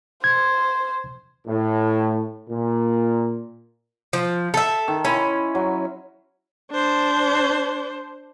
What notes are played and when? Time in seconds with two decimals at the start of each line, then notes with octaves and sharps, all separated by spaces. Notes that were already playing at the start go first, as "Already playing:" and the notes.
0.24 C5 G#6
1.47 A2
2.50 A#2
4.13 F3
4.54 A4 E5
4.88 D#3
5.05 C#4 E4 B5 C6
5.55 F#3
6.71 D4 C5